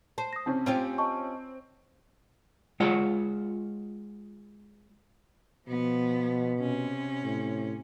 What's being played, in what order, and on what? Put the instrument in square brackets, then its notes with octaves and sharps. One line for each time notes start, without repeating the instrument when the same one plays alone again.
[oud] C5 [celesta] A5
[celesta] D#6 A#6
[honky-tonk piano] C3 C4 C#4 [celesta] A5
[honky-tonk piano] C4 [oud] C#4 F4 G4
[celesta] D#5 A5 C#6
[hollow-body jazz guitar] G#3 F4 C#5 F#5
[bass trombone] B2 [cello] F3 B3
[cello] C3 C#4
[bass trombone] A2